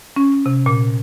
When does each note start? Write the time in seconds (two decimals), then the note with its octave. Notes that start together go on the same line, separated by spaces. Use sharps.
0.16 C#4
0.46 C3
0.66 A#2